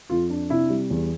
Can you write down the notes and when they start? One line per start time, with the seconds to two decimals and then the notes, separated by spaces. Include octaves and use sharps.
0.10 F2 F4
0.30 D4
0.50 C3 E4
0.70 G3
0.90 E2